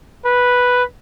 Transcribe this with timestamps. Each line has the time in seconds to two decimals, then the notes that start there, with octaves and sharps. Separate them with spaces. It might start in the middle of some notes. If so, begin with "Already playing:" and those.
0.25 B4